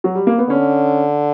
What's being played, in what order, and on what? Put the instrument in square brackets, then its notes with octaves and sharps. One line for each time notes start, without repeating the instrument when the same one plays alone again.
[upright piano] F#3
G3
A#3
B3
[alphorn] D3 [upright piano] C#4